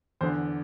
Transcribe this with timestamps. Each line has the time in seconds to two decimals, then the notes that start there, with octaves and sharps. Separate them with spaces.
0.21 E2 D3 C5